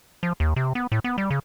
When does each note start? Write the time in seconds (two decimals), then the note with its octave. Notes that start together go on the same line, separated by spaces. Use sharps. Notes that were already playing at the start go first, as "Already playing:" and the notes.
0.23 F3
0.40 D#2
0.56 C3
0.75 B3
0.92 A2
1.04 B3
1.18 G3
1.30 C#3